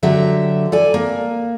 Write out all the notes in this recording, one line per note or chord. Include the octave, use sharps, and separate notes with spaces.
D3 F#3 G4 E5
A4 D5 G#5
A#3